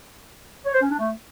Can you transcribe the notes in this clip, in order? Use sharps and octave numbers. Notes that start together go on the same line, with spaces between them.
C#5
C5
C#4
D4
A3